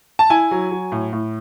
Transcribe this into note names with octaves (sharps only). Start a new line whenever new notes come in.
A5
E4 G#5
F#3
F#3
A2
A2